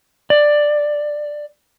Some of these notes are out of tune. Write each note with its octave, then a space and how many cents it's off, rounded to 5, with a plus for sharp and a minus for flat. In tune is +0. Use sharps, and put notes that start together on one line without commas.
D5 +10